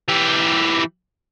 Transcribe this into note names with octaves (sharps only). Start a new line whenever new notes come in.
E3 G4